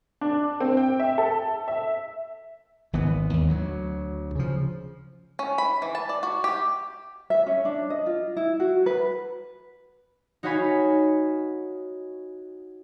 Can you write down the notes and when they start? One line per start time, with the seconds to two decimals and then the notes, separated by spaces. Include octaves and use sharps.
0.21 D4
0.61 C4
0.77 G5
1.00 E5
1.18 A4
1.68 E5
2.93 G#1 E3 B3
3.33 D#2
3.47 D2 F#3
4.36 C#3 F3
5.39 C#4
5.58 B5
5.82 E3
5.95 A5
6.09 D5
6.23 F#4
6.44 G4
7.30 E5
7.46 C#4
7.65 D4
7.90 D#5
8.06 F4
8.37 E4
8.60 F#4
8.86 B4
10.43 D#4 F#4 C#5 F5 G#5 B5